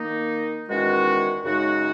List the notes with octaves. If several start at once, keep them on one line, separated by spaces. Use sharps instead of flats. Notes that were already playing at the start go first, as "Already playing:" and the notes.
Already playing: D#3 A#3 D#4
E2 D#3 G#3 C#4 F#4
F#2 C#3 G#3 D#4 F#4